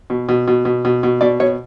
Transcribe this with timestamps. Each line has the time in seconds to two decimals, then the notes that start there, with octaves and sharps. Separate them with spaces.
0.10 B2
0.29 B2
0.48 B2
0.65 B2
0.85 B2
1.03 B2
1.21 B2 D5
1.40 B2 C#5